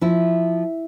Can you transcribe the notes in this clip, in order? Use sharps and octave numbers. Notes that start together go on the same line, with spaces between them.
F3 E4